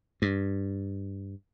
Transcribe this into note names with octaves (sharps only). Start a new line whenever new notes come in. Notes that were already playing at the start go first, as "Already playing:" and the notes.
G2